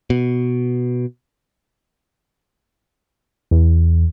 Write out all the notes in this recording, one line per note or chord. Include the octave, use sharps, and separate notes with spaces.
B2
E2